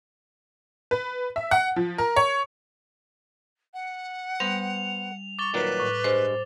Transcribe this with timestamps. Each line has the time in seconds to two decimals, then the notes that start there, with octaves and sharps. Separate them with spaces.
0.91 B4
1.36 E5
1.51 F#5
1.76 F3
1.98 A#4
2.16 C#5
3.73 F#5
4.40 G3 B3 C5 F7
5.39 C#6 D6 A6 G7
5.54 A#2 D#3 F#3 B4
5.80 A2
6.04 G2 G#3 C5